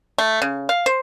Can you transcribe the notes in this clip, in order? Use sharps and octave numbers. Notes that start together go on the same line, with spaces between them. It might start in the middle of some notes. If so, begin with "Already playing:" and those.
A3
C#3
F5
C5